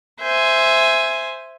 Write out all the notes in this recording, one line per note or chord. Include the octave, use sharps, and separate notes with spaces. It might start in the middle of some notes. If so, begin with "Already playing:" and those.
C5 E5 G#5